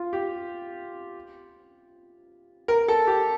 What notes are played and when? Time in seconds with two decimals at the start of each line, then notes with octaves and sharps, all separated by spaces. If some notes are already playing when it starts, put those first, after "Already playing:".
Already playing: F4
0.13 G4
2.68 A#4
2.88 A4
3.07 G4